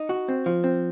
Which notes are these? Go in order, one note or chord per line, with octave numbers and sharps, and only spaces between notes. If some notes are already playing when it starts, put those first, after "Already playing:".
Already playing: D#4
F#4
C4
F3
C4